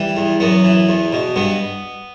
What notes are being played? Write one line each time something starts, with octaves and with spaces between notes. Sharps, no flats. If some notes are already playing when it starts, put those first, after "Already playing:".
Already playing: E3 G3 G4
E2
F#2 B3
E3
E2
B2
G2 B3